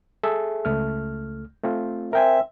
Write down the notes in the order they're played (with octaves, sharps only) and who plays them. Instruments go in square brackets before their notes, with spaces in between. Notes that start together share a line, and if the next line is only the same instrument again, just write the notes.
[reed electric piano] G#4 A4 E5
C#2 A3 F6
A3 C4 F4
[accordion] C4 E5 [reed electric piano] A#4 G5 G#5